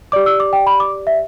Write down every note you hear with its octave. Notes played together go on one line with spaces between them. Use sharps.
G4 D5 D6
E6
D6
G5
B5
D6
E5